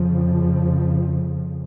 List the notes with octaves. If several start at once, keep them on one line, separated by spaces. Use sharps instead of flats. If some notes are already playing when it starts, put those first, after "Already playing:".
Already playing: F2 C#3 F3